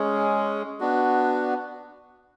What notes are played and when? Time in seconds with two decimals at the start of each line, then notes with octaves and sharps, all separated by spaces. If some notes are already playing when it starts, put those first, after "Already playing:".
Already playing: G#3 C#4 G#4
0.80 B3 D4 F#4